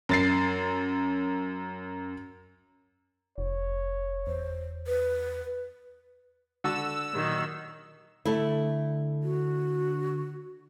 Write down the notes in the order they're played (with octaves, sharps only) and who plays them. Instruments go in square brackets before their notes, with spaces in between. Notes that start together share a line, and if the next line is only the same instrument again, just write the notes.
[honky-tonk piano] F#2 A6 C7
[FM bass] F1 [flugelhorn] C#5
[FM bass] E2 [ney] C5
[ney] B4
[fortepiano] D3 F#4 A4 [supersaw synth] E6
[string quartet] A#2 D#3 F#3
[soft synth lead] D3 [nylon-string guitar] A3 E4
[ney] F#4